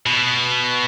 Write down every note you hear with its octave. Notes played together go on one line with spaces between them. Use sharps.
B2